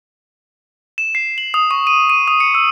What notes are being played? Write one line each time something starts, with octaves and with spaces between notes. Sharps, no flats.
E7
C7
F#7
D#6
C#6
D#7
D#7
D#6
C#7
E6